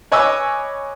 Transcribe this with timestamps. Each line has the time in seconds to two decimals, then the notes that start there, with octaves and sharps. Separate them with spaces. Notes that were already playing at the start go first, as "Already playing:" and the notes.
0.12 B4 C#5 D#5 G#5 D6 E6